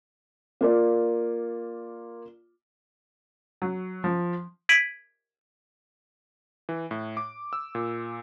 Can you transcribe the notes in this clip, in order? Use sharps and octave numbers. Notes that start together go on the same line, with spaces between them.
A#3 F4 D5
F#3
F3
G#6 B6 D7 D#7 F#7
E3
A2
D6
E6
A#2